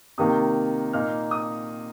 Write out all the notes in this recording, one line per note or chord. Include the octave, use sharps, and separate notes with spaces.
C3 D#3 A#3 D#4 D#6
A#2 A#3 D#4 F6
D#6